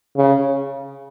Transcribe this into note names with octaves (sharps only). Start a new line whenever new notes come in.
C#3